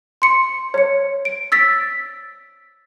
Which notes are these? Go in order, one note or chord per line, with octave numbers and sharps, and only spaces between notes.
C6 C#7
C#5 C#7
D7
E6 A6 B6